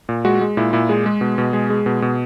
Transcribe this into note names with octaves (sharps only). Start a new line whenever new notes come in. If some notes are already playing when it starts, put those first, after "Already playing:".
A#2
G#3 F#4
G#3
A#2 E4
A#2 E4
G#3 G#4
G#3
B2
B2
G#3 G#4
G#3
B2
B2